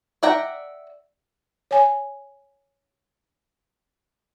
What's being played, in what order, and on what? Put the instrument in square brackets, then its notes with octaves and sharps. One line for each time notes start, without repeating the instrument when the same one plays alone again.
[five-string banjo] D5 E5 F#5 G5 A#5
[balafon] C#5 G#5